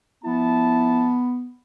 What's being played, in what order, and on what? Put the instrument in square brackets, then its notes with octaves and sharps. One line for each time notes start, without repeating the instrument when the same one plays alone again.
[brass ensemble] F3 E4 A5 [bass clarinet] B3